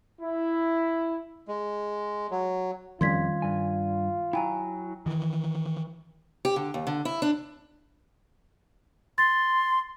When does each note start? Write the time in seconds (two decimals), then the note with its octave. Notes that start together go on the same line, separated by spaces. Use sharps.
0.21 E4
1.48 G#3
2.31 F#3
3.01 F2 D#3 G3 C#4 F4 C6 G#6 B6
3.42 G2 G#5
4.33 F#3 E4 G5 G#5 A#5
5.06 D#3 E3
6.45 G4
6.56 D3
6.74 D#2
6.87 D3
7.05 E4
7.22 D4
9.18 C6 A6